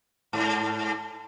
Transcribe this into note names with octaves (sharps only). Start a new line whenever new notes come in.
G#2